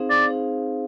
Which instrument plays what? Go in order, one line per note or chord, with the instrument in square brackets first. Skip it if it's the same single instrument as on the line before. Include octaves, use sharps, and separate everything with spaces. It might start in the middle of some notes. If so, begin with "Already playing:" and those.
Already playing: [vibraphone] C4 D#4 G#4 C5 F5
[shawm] D5
[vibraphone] D#4 G#4 C5 F5